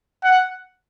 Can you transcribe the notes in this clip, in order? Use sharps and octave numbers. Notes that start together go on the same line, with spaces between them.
F#5